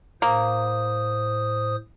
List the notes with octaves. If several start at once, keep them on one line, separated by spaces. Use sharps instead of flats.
A2 A#3 C5 D#6